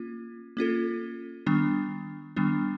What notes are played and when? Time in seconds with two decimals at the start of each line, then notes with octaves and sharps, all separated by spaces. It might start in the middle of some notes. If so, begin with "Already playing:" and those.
Already playing: A#3 C#4 F4
0.57 A#3 C#4 F4 A4
1.46 D#3 G3 B3 D4
2.36 D#3 G3 B3 D4